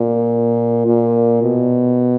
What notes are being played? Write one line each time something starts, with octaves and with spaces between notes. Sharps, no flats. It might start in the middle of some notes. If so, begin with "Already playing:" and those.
Already playing: A#2
A#2
B2